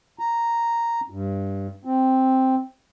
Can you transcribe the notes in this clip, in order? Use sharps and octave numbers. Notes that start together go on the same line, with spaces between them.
A#5
G2
C4